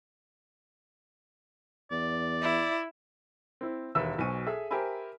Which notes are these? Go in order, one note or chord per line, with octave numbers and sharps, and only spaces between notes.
E2 D5
E4
C4 E4
E1 D#2 B4 E5 E6
B1 B2 C5 G#5 C#6 D#7
G#4 A4 E5
G4 A#4 C5 E5 G#5 B5